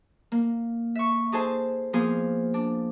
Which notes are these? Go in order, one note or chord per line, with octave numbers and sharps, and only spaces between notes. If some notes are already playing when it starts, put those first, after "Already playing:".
A#3
E5 C#6
D#4 G#4 A4 C5 A5
F3 A#3 B3 G#4 C5
D4